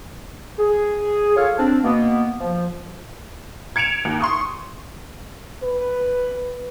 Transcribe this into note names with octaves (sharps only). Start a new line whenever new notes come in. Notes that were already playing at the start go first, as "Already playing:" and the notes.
G#4
F4 A4 C#5 F5
C4 D4
B2 A#3 B3
F3
G#6 C#7 D7 E7 F7
D#2
C6 C#6 D#6
B4